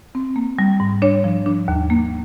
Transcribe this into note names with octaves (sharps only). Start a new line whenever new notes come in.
C4
A#3
G3
G#2
D4 C#5
F3
D4
D#2
A#3